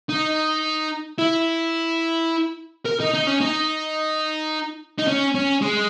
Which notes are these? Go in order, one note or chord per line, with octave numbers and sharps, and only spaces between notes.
D#4
E4
A#4
D#4
D#4
C#4
D#4
D#4
C#4
C#4
G#3